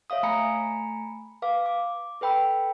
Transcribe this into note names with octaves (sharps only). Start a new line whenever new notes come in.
C#5 E5 F5 D#6
A3 G#5 A#5 B5 C#7
B4 F5 D6
D6
A4 B4 G5 B5 E6